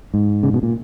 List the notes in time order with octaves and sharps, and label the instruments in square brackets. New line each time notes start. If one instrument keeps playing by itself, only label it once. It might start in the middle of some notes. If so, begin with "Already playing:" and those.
[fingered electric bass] G#2
C#3
B2
A#2